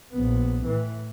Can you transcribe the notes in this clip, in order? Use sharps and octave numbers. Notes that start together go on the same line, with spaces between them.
A#1 B3
A2 E3